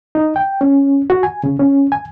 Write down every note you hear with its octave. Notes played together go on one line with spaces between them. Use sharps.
D#4
G5
C#4
F#4
G#5
C#3
C#4
G#5